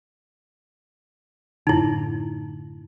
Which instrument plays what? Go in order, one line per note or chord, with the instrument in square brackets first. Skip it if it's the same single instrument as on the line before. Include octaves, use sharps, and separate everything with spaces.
[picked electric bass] F#2 A2 D3 [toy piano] D#4 E4